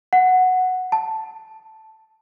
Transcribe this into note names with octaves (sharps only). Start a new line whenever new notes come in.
F#5
A5